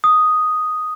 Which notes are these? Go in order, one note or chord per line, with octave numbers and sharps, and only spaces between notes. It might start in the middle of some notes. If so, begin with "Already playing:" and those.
D#6